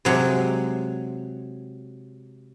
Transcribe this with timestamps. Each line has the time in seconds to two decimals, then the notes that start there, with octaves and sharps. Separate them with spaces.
0.05 C3 F#3 G#3